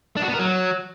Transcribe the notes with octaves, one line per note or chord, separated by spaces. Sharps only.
D4
F#4
B3
A#4
F#3